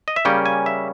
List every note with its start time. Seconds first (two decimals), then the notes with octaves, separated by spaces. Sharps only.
0.08 D#5
0.16 E5
0.25 C#3 G3 A#3 C#4 G5
0.46 G#5
0.66 E5